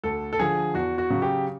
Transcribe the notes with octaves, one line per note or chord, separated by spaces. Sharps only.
D2 A4
A4
D3 F3 G#4
E2 F#4
F#4
C#3 F#3
G4